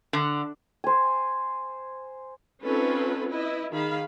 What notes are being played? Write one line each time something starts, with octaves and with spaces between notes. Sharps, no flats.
D3
C5 G#5
C4 C#4 D#4 F4 A4 B4
E4 B4 D#5
D#3 G#4 F5 B5